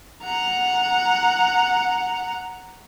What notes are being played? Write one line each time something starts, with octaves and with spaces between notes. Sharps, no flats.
F#5 A#5